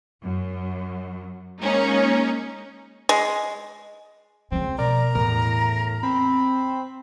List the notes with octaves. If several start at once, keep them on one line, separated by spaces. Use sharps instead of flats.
F#2
G#3 A#3 C#4 D#4
G#3
C#2 F3 C4
B2 A#4 D5 A#5
E2 A2 A#4
C4 B5